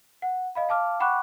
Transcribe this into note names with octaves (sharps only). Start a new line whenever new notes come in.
F#5
D#5 F5 B5
F5 A5 D6 F6
F#5 G5 B5 C#6 D6 F#6